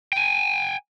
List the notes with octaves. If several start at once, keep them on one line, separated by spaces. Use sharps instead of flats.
G5 G#5